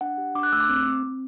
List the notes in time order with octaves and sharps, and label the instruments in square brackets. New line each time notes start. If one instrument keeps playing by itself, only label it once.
[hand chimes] D4 F#5
G4
D4 D6
F#6
A3 E6
D6
C4
C4
C4